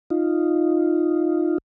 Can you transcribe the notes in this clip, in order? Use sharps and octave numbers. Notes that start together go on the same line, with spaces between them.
D#4 F4